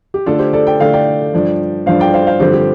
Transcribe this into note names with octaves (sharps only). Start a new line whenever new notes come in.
G4
D3 A3 D4 F4 A4
G4 C5
A4 D5
G5
D3 A3 D4 F5
D5 G5
G2 F3 D4
G2 F3 D4 C5 F5
D5 G5
C5 F5
C5 F5
G2 D3 F3 C4 G4 C5
G4